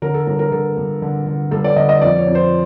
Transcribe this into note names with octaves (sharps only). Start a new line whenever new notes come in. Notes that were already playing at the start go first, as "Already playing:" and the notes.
D3 A#4
A4
G2 A#4
A#4
D3 A4
G2
D3
D3
G2 A4
D5
D3 D#5
D#5
F2 D5
C#5
F2
C5